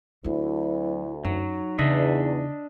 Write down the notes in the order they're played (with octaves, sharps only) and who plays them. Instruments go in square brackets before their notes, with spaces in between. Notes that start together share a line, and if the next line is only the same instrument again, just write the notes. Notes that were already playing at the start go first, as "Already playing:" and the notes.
[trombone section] D2 [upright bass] F#3 C4 [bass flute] E4
[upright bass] F#2 [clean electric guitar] F#3 [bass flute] D#4
[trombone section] E2 [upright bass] C#3 [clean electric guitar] D4 D#5 E5